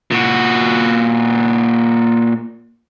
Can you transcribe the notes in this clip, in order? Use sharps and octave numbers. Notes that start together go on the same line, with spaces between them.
A#2 F#4